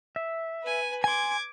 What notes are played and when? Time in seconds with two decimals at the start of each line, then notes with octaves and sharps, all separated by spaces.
0.16 E5
0.63 B4 G#5
1.04 G#5 C6 D6 G#6